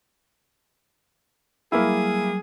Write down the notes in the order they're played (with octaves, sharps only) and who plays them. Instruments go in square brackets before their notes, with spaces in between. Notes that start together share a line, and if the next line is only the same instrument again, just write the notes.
[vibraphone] F#3 G3 [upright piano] A#3 E4 [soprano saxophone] G#4